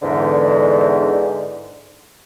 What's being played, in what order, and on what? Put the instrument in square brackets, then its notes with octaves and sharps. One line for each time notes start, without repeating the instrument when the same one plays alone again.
[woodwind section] E2 G#2 D3